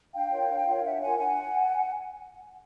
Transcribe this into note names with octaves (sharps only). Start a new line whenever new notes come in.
D4 F5 G5
F4 A#4 C#5
D4
F4 A#4 C#5
D4 E5 F#5
F4 A#4 C#5 F#5 G#5
D4 F#5 G#5